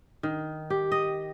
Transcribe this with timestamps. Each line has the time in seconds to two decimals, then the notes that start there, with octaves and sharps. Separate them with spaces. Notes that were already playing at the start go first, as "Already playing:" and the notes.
0.23 D#3
0.70 G4
0.92 D#5